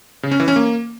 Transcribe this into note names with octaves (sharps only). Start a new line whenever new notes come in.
C#3
C#4
E3
C#4
A#3